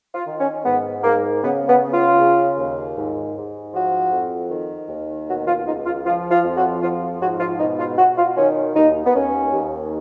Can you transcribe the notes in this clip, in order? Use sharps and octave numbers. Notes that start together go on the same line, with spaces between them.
F4
D#3
C#4
G#2 B3
G#2 A#3
C#3 B3
B3
C#3
F4
C#3
D#2
G#2
G#2
F3 F#4
F2
D#3
D#2
B2 F#4
F4
C#2 D#4
F4
F3 F4
F4
F2
F#4
F3 F4
G#2 F#4
F4
B2 D#4
F4
B2 F#4
F4
D#3 C#4
D#2 D#4
B3
D#2 C#4
D#2